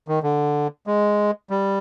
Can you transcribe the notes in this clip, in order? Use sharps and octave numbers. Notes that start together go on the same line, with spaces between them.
D#3
D3
G#3
G3